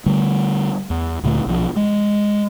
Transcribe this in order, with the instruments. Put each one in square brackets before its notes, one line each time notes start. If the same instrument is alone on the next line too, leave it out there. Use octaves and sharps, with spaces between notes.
[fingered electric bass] D3 G3 A3
E2
D2 A#2 D3 A3
B1 F3
G#3